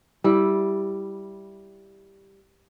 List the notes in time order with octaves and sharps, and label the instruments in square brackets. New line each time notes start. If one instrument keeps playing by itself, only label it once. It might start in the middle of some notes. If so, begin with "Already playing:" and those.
[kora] G3 E4